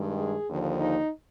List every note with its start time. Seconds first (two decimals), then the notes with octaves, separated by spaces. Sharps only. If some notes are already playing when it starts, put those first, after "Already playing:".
Already playing: G2 D#3 G#3
0.17 G#4
0.48 D#2 D3 F3
0.78 D#4